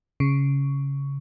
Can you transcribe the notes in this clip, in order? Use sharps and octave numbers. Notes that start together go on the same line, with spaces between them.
C#3